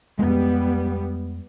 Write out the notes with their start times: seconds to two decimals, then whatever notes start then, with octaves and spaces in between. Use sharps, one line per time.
0.19 F2 G3 G#3 B3